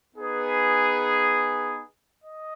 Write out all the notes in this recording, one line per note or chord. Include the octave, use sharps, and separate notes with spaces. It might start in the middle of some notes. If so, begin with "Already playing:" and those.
B3 D#4 G#4 B4
D#5